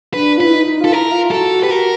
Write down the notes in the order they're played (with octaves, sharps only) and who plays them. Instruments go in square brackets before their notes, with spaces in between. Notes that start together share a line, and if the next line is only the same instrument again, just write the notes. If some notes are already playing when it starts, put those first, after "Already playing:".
[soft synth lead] D4 [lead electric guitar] B4
[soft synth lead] F4
[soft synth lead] E4 [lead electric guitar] B4
[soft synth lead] D#4
[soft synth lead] F4 [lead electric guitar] A4
[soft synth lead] E4 [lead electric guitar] A#4
[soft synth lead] F4
[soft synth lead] F#4 [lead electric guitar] A4
[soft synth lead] F#4
[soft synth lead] G4 [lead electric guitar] B4
[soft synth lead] F#4 [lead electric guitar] A#4